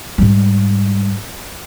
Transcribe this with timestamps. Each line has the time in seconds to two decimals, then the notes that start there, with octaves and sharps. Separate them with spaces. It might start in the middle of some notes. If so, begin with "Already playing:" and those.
0.18 G#2 G3